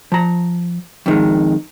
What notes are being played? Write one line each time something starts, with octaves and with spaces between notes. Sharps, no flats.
F3 A#5
F2 D#3 G#3